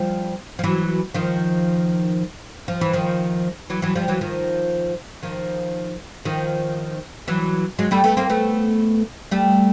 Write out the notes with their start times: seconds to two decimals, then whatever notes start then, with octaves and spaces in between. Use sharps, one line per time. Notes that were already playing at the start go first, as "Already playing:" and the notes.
Already playing: F3 G3
0.59 F3
0.64 E3 F#3
1.14 D#3 F3
2.68 F3
2.81 E3
2.93 D#3 F3
3.70 E3 F#3
3.82 E3 F#3
3.95 F3 G3
4.08 E3 F#3
4.21 D#3 F3
5.23 D#3 F3
6.25 D#3 F3
7.28 E3 F#3
7.79 F#3 G#3
7.91 G3 A3
8.04 A3 B3
8.17 A#3 C4
8.30 A3 B3
9.31 G3 A3